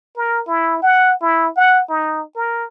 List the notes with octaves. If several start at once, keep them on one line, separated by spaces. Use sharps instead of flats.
A#4
E4
F#5
E4
F#5
D#4
A#4